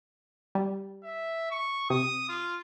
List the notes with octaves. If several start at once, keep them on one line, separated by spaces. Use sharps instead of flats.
G3
E5
C#6
C3 D#6
F4